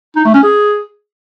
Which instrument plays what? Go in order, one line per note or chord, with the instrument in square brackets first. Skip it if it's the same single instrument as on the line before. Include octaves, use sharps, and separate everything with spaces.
[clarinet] D#4
A3
C#4
G#4